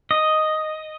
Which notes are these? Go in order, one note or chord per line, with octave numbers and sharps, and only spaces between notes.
D#5